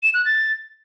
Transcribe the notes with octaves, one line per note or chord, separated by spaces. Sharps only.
E7
F#6
A6